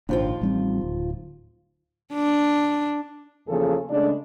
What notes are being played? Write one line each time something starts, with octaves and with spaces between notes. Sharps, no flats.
G#1 D#2 A#2 F3 D4 F4
A1 G3 C4
D1
D4
E2 C#3 F3 A#3 G#4 A4
C#3 G#3 A3 D4